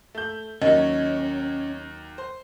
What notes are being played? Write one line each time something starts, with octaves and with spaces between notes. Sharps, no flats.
A3 G6
D#2 F#3 C#4 D#5
C5